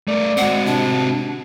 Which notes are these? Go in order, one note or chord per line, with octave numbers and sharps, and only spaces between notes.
A3 A#4 D5
G#3 C4 F#4 F#5
C3 D4